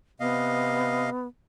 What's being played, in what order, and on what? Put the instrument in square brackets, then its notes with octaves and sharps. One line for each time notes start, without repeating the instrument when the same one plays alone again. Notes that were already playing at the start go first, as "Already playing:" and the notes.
[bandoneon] C3 D#5 F5 [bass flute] B3